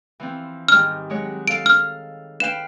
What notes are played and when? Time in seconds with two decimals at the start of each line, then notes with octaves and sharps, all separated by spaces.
0.20 E3 F3 C4
0.68 G#2 D#3 G3 F6
1.10 F#3 G#3 C#5
1.48 A4 F5 D7
1.66 F6
2.40 B4 F5 G5 E7